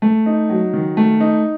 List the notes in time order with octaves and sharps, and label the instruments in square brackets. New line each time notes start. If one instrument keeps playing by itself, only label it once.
[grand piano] A3
D#4
F#3
D#3
A3
D#4